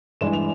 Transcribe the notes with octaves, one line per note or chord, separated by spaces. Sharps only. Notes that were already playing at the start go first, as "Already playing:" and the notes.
G2 E3 G#3 E7
F7